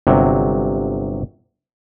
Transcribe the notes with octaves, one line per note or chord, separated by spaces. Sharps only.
G1 C3 F#3